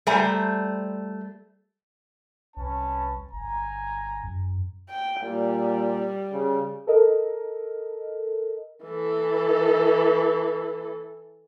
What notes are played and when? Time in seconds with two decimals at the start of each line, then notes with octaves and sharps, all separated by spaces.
0.07 G3 A3 C5 G#5 A#5
2.57 C2 C#4 B4 A5
3.33 G1 G#5 A#5
4.24 F#2
4.89 G5
5.22 A#2 G3
6.33 C#3
6.87 A4 A#4 D#5
8.84 E3 A4